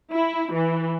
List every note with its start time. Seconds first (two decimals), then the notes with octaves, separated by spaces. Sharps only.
0.12 E4
0.54 E3